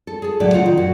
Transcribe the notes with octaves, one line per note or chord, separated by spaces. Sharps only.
A4
G#4 A4
D2 A2 F#3 D5
C#3 F4 F#5
D#3
F#2 A#2 F#4